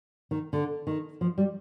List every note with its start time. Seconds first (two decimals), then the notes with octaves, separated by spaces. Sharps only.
0.31 D#3
0.53 D3
0.87 D#3
1.21 F3
1.38 G3